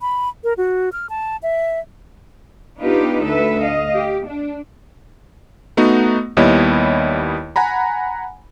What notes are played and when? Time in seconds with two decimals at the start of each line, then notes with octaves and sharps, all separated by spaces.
0.01 B5
0.44 A#4
0.57 F#4
0.92 F6
1.10 A5
1.43 E5
2.78 B3 D4 D#4 F4 G4 B4
3.23 D2 A4 B4 E5
3.62 D#5 F5
3.95 G4
4.26 D4
5.77 A3 B3 D#4 F#4
6.37 D#2 G3 B3 E4 C#5 D#5
7.56 F#5 G#5 A#5 B5